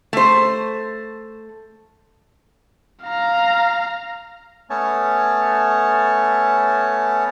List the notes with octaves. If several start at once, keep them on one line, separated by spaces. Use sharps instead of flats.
A3 C5
F5 A#5
A3 B3 C#4 C#5 A5